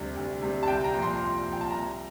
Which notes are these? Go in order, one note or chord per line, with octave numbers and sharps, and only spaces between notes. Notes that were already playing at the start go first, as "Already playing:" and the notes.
Already playing: D2 C3 G3
D2
C3 G3
A5
C2 G5
A#5
A#2 F3
C6
C2
A#2 F3
G5
A5
C2 A#5